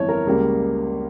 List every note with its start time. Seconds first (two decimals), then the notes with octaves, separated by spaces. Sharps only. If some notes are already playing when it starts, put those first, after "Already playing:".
Already playing: G1 F2 E3 C#5 A5
0.09 A#4
0.26 C#2 C#3 G3 A#3